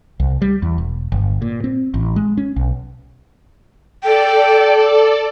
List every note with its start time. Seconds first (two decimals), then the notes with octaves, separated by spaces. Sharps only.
0.20 C2
0.42 G3
0.62 E2
0.78 E1
1.12 G1
1.42 A#2
1.64 C4
1.94 A1
2.16 G#3
2.37 C#4
2.56 B1
4.03 A4 D5 G5